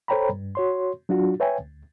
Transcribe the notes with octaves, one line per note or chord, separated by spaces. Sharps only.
A4 C5 C#5 G5 A#5 B5
G2
F#4 C#5 C6
F#3 D4 F4 F#4
B4 C#5 E5 G5 G#5
D2